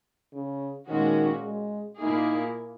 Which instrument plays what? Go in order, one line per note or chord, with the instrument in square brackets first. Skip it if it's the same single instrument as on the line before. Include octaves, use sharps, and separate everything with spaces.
[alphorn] C#3
[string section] A#2 G#3 C#4 F#4 [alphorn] D#3
[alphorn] G#3
[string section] A#2 A#3 E4 G#4 [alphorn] D#4